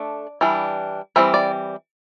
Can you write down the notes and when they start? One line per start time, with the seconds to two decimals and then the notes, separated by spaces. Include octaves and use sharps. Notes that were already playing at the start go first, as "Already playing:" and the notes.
Already playing: A3 D4 D5
0.41 E3 G3 D4
1.16 E3 G3 C4 E5
1.34 D5